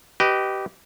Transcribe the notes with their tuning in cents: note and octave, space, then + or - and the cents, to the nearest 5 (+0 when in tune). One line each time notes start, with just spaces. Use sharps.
G4 -20 B4 +5 D#5 -10